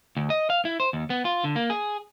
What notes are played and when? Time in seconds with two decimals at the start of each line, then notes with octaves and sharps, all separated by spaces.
0.17 D2
0.30 D#5
0.50 F5
0.65 E4
0.80 C5
0.93 D#2
1.10 B3
1.25 F4
1.44 D3
1.56 A#3
1.70 G#4